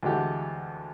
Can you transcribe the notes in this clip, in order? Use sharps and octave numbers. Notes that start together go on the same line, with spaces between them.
D2 E3 G#3 F#4 G4 A4